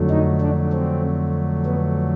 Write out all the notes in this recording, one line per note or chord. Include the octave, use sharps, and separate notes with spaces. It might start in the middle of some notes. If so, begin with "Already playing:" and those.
Already playing: F2 D3 F#3 A3
D#4
D4
C4
B3